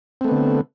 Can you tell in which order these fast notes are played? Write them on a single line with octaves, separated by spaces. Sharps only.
C4 A3 B3 D3